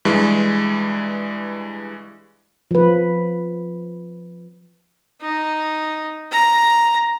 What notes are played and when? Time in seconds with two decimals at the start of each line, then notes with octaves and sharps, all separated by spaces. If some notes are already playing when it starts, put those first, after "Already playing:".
0.05 G2 E3 G#3
2.71 F3 B4
5.21 D#4
6.31 A#5